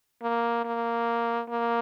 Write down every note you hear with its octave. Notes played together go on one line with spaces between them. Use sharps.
A#3
A#3
A#3